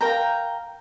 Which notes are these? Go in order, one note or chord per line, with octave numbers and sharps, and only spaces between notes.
A#4 F5 G5 A#5